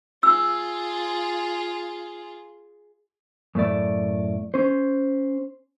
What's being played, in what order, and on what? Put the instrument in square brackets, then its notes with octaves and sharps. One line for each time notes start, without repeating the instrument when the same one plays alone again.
[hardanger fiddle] F4 G#4 [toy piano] E6
[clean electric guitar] F#2 A2 A3 D5
C#4 C5